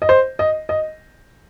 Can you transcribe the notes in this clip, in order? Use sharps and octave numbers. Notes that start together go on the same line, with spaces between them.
D#5
C5
D#5
D#5